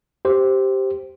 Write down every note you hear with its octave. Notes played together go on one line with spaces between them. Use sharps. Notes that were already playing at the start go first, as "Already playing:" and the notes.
G4 C5